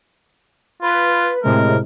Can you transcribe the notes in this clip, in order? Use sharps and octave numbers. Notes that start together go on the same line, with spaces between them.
F4 B4
A2 C3 G#3 A#4